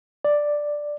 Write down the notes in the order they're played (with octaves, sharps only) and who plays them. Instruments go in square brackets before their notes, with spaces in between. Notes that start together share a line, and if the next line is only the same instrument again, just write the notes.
[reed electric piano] D5